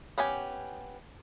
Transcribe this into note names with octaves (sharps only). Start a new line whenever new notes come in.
B3 C#4 G4 G#5